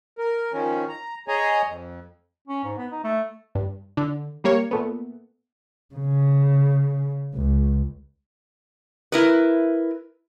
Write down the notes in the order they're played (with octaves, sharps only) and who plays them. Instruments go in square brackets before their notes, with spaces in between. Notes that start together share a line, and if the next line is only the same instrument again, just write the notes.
[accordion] A#4
D#3 F3 C#4
A#5
G#4 C#5 D#5 G#5 A#5
F2
[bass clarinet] C#4
G#2
B3
D#4
A3
[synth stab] G2
D3
G3 A#3 C#5
A#2 A3 B3
[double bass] C#3
C#2
[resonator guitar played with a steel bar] E4 A#4 B4